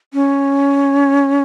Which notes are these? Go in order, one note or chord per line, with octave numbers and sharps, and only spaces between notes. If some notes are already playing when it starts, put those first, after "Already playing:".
C#4